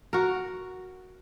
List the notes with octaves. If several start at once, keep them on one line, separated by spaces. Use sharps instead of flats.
F#4 A#4